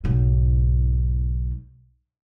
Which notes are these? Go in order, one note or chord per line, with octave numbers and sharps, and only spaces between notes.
B1 G#2